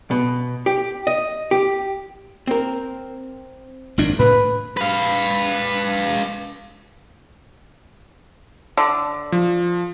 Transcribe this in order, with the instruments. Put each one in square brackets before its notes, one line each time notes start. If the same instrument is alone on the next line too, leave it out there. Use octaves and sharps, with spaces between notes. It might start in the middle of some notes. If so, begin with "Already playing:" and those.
[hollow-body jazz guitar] B2
G4
D#5
G4
C4 A#4
[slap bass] G#1 F#2 D4
[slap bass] A2 [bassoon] B4
[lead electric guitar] B4 F5
[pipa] D3
[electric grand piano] F3